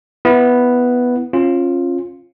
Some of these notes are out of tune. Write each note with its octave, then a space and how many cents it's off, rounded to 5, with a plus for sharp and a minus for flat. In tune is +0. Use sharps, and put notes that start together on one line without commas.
B3 +0 E4 +0
C#4 -35 F4 +0